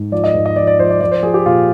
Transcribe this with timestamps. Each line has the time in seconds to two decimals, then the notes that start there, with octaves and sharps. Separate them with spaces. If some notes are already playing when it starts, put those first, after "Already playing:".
Already playing: G#2
0.12 F3 D5
0.24 D#5
0.34 G#2
0.46 D#5
0.56 F3 D5
0.67 D5
0.79 F3 C5
0.90 D5
1.00 F3 D5
1.11 C5
1.23 F3 G#4
1.34 G4
1.46 A#2 F4